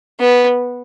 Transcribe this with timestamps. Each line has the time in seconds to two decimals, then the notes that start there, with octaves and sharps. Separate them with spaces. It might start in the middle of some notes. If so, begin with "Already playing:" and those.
0.20 B3